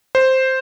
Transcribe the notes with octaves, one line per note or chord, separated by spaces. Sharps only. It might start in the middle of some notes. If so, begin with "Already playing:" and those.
C5